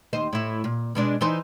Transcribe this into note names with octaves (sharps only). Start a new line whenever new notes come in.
D#2 C5 D#5
A2 E4
A#2
B2 G#3 D4
E3 D#4 C5